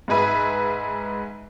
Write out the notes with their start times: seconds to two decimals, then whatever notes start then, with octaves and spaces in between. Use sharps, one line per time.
0.08 G#2 G#3 G#4 B4 E5